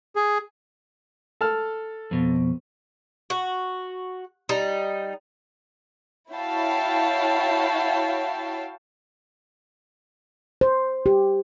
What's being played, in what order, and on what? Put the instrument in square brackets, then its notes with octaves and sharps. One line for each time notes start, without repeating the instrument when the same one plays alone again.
[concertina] G#4
[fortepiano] A4 A5 F6
[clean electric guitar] F2 B2
[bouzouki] F#4
G3 D#4
[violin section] E4 F#4 C#5 F5 G5 A5
[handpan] C5
G4